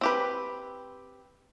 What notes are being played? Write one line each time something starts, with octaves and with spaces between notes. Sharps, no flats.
C4 G4 B4